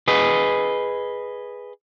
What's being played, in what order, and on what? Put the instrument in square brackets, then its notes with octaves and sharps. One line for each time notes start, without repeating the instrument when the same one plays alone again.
[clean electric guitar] G#4 B4 D#5